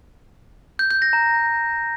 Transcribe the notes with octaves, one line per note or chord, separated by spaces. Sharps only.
G6
G6
A#6
A#5